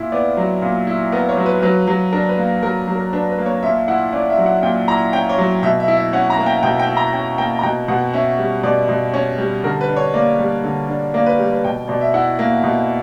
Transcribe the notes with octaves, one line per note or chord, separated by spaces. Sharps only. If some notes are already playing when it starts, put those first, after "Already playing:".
Already playing: A#2 E4
B3 D5
F#3
A#2
E4
B3 A#4
C#5
F#3
B4
F#3 B4
F#3
D4 A#4
B4
A#3
F#3 A#4
F#3
A#4
D4 B4
B4
A#3
C#5
A#2 E5
E4 F#5
C#4 D5
E5
F#3
F#5
A#2 G5
E4 A#5
C#4 G5
C#5
F#3
B2 E5
E5
E4
E5
C#4 F#5
A#5
A#3
G5
B2 G5
G5
E4
A#5
C#4 G5
A#3 G5
A#5
B2 G5
B2 F#5
C#4 E5
G3
B2 D5
B2
C#4 C#5
G3
D3 A#4
B4
D4
C#5
A#3 D5
G3
D3
D4
A#3 D5
B4
G3
B4
B2 G5
B2 D5
E5
E4 F#5
A#3
B2